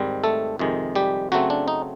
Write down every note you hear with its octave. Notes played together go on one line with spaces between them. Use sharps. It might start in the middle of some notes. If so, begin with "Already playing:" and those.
Already playing: G#2 D#3 G3 C4
A3 A4
F2 C3 D#3 G#3
G3 G4
C#3 F#3 A3 C4 F#4
D4
D#4